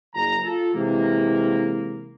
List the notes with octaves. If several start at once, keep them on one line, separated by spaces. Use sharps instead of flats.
F#1 A#5
F4 A4
C3 E3 G#3 A#3